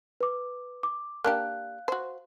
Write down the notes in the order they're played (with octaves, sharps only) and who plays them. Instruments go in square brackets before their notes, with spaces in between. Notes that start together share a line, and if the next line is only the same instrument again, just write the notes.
[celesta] B4 D6
D6
[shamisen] A#3 D4 G4 [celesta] F5 F#6
[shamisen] F#4 C5